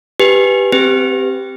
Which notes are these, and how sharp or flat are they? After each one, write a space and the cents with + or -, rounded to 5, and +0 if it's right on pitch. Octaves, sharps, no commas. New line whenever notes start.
G4 +0 B4 +0 G#5 +0
C4 +0 G4 +0 B4 +30